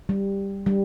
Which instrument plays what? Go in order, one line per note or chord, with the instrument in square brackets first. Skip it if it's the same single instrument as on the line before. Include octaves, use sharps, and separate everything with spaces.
[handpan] G3
G3